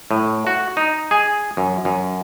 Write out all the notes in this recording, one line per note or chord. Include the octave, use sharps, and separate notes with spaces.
A2
F#4
D#4
G#4
F#2
F#2